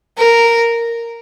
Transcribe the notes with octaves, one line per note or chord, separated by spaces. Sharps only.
A#4